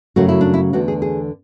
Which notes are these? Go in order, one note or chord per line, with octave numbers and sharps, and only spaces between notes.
F#2 C#3 F#3 A3 F#4
E4
D4
E4
E2 D3 A3 F#4
G#4
G#4